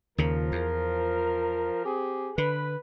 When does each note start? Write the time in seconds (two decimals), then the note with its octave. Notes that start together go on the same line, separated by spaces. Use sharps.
0.18 D#2 C#3 F3 A#4
0.52 E2
1.85 C4 G4 G#4
2.38 D3 B4